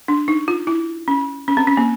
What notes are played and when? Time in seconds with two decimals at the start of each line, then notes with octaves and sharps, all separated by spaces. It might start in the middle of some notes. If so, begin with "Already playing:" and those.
0.08 D4
0.28 D#4
0.48 F4
0.67 E4
1.08 C#4
1.48 C#4
1.57 C4
1.67 C#4
1.77 A#3